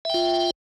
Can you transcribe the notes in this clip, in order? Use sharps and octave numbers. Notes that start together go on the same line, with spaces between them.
F4 E5 G5